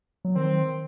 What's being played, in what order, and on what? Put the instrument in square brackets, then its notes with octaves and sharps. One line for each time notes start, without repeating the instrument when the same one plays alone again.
[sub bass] F#3
[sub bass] D#3 [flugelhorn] C4